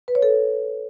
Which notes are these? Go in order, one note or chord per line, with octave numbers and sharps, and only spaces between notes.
B4
C#5
A4